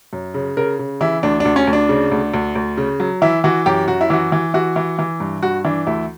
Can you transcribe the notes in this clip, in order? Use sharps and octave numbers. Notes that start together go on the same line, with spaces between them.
F#2
C#3
C#3 A#4
C#3
E3 E4
D2 D4
D4
D2
C#4
D2
D4
C#3
D2
D2
D2
C#3
F#3
E3 E4
E3 F#4
F#2 G4
F#2 F#4
E4
E3 F#4
E3
E3 F#4
E3
E3
G2
G2 F#4
E3 D4
D2 E4